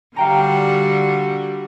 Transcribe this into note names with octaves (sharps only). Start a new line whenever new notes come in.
D3 G3 F#4 F5 G5 A#5